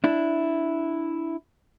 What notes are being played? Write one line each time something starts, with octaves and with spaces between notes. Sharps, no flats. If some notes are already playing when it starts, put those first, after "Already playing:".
D4 E4